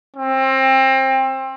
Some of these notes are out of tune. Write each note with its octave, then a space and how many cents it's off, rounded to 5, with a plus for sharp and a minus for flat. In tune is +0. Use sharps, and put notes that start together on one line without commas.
C4 +25